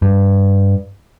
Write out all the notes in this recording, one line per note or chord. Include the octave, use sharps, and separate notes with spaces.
G2